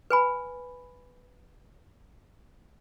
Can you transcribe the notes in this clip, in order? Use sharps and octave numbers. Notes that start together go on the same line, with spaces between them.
B4 G#5 B5